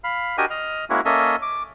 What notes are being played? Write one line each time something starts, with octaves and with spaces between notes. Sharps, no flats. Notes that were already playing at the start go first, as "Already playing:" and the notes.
F5 B5
D4 F#4 G4 A#4 D#5 G#5
D#5 F6
G#3 A#3 C#4 E4 F#4
A#3 C#4 A4 D#5 E5
D6